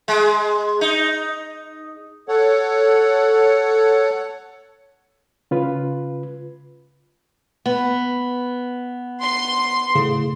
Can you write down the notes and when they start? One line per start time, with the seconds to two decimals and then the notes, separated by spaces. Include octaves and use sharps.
0.08 G#3
0.81 D#4
2.29 A4 C#5 F#5
5.51 C#3 F4 B4
7.66 B3
9.22 C6
9.95 A2 C#3